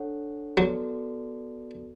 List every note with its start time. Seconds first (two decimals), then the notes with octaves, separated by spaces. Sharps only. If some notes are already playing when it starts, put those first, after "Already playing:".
Already playing: D4 A4 C#5 F#5
0.57 F#3 B3 F#4 A4 D5